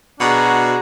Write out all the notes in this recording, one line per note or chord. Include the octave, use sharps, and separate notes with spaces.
B2 D4 F#4 G#4 A#5